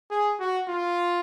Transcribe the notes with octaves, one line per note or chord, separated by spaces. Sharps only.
G#4
F#4
F4